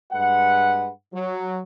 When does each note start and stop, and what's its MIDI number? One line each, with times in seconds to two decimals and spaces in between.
0.12 0.90 43
0.12 0.90 56
0.12 0.90 71
0.12 0.90 78
1.14 1.61 54